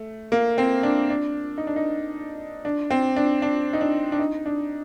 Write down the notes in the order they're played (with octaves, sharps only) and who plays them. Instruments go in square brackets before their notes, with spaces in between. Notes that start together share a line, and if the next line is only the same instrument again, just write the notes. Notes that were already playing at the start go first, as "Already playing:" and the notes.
Already playing: [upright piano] A3
A#3
C4
D4
D4
D#4
D4
D#4
D4
C4
D4
D4
D#4
D4
D4
D#4
D4